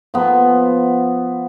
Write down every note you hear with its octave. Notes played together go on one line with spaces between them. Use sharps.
F3 B3